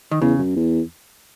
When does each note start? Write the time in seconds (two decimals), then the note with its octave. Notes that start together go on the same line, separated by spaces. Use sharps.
0.11 D#3
0.21 E2 C#3
0.39 F#2
0.56 E2